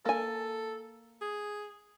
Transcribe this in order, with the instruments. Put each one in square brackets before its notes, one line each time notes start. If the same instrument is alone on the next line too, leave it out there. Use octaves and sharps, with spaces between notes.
[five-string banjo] A#3 G#5 [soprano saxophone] A4
[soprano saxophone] G#4